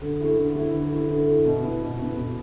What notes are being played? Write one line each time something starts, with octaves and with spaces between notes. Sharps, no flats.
D3
A3 E4
D3
A3 E4
D3
A3 E4
D3
A3 E4
B2
B3 E4
B2
B3 E4
B2